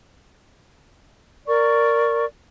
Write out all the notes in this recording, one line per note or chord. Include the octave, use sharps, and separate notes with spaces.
A#4 D5 C#6